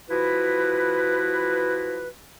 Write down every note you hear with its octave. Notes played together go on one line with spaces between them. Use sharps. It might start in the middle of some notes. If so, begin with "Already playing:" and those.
F3 E4 F#4 B4